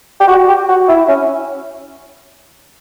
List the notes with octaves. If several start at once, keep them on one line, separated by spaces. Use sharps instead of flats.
G4
F#4
G4
F#4
E4
C#4